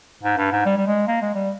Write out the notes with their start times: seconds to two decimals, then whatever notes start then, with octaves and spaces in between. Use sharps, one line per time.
0.23 G#2
0.37 G2
0.52 G#2
0.66 G3
0.77 G3
0.87 G#3
1.08 A#3
1.22 G#3
1.35 G3